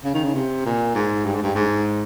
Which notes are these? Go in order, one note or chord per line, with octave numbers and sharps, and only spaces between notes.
C#3
D#3
C#3
C3
A#2
G#2
G2
G#2
G2
G#2